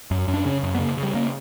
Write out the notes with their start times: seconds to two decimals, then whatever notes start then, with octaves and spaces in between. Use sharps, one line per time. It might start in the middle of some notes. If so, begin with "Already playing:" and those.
0.11 F#2
0.28 F#2
0.34 D4
0.45 C#3 C#4
0.63 F#2
0.75 B3
0.79 C#3 A#3
0.97 C#3
1.03 G3
1.14 C#3 A#3